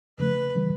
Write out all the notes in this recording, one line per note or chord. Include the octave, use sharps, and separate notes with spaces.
E2 C#3 F3 A3 B4
C#3 E3 G3